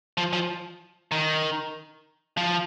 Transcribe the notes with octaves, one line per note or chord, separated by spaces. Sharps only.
F3
F3
D#3
F3